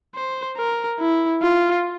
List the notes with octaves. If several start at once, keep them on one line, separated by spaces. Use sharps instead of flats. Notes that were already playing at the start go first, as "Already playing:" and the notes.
C5
A#4
E4
F4